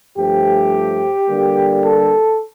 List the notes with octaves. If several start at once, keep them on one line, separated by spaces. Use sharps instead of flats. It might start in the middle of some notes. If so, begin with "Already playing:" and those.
G2 F3 A3 G4
D3 G3 A#3
A4